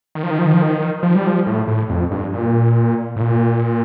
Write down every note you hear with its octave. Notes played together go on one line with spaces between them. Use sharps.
D#3
F3
D#3
F3
D#3
F3
D#3
F3
G3
F3
A2
A2
F2
G2
A#2
A2
A#2